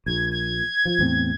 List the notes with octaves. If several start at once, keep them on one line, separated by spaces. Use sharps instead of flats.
A#1 G#6
G#6
F3
E2 A2 C4